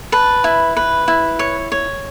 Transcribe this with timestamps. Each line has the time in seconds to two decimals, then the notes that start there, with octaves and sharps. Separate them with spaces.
0.12 B4 A5
0.44 E4
0.77 B4
1.08 E4
1.39 C#5
1.72 C#5